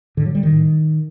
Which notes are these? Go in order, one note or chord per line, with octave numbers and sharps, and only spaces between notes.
A2 D3
F#3
G3
D#3
A2